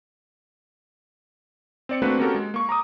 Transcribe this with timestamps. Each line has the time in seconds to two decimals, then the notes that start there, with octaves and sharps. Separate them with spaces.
1.89 C4 D5 C#7
2.02 A3 A#3 C4 D4 F#4 B4
2.19 A#3 C#4 F#4 G4 A4 A#4
2.35 G#3
2.54 A#3 C#6
2.69 A#5 D6 D#6